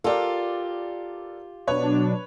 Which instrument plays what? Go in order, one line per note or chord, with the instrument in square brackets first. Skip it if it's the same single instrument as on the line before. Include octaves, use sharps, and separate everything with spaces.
[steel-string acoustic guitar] F4 G4 [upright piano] A4 A#4 D5
[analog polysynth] B2 F#3 D4 [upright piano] B4 C#5